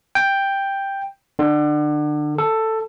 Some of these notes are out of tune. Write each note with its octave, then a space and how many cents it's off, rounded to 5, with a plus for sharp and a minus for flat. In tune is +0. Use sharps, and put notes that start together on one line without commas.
G5 +5
D3 +30
A4 +10